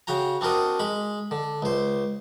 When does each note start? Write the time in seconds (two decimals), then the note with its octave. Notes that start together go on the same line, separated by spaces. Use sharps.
0.07 C#3 F#4 G5 A#5
0.41 C4 D4 F#4 A#4 D#5
0.79 G#3 B5
1.31 D3
1.62 C#2 C5